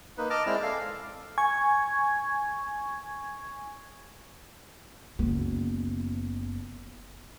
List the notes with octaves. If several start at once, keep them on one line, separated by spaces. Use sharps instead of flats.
A#3 D#4 B4
D#5 A5 D6 F6
G#3 C4 E4 D5 F6
A4 F5
G#5 C#6 G#6
F#1 B3